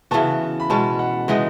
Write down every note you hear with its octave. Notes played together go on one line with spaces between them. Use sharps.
C#3 E3 B3 F#4 A5
B5
B2 G#3 C#4 A5
F#5
E3 G#3 B3 D#4 D#5